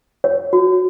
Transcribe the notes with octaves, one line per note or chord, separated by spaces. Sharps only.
C#5
F#4